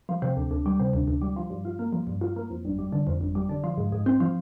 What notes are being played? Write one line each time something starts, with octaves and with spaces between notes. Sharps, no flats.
F3
C3
D2
D2
G3
C3
D2
D2
G3
F3
G2
F4
A#3
F3
G2
F4
A#3
F2
G1
G3
D3
F2
G1
G3
D3
F3
G#2
G#2
C4
F3